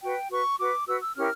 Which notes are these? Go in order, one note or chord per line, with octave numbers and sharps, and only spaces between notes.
F#4 B4 G5
F#4 B4 C#6
F#4 B4 D6
F#4 B4 E6
E6
C#4 E4 G4 A#4 F6